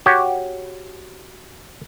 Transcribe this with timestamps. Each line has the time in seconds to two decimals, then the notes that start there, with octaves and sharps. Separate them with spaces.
0.06 F#4 G4 C#5